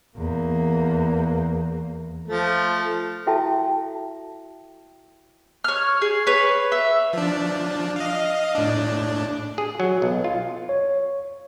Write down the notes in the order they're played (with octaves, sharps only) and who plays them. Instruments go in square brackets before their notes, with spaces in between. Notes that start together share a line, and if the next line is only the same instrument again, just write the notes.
[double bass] E2 A#3
[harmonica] F3 A3
[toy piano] E4 F#4 A4 E5 G5 A5
[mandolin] C#5 F6
G#4
B4 C#5
E5
[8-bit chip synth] F3 D4
D#5 F5
A2 D4
[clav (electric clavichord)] G#4
F#3
B1
F4
[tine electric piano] C#5